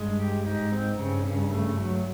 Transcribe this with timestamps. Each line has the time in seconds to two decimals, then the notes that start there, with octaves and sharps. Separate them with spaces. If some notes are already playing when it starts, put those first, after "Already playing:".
Already playing: G2 G#3
0.20 G4
0.46 G#2 D#4
0.72 C4
0.98 G2 C#3
1.25 C#3
1.51 A3
1.78 F#3